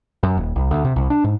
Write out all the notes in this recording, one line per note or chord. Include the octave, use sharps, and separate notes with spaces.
F#2
D#1
C2
D2
C3
C2
D4
G#2